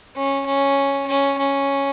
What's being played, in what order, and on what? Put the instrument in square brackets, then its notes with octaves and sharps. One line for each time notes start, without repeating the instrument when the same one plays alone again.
[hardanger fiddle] C#4
C#4
C#4
C#4